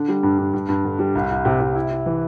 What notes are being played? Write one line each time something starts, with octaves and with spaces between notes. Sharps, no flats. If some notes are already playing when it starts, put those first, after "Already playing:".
Already playing: D3
G3
G2
G2
G2
G2
D3
G3
C2
C2
C3
C3
E4
E4
E3